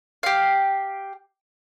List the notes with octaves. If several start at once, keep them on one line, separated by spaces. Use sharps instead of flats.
G4 F5